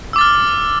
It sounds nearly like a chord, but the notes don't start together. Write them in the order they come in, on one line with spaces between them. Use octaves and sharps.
E6 D6 A6 F6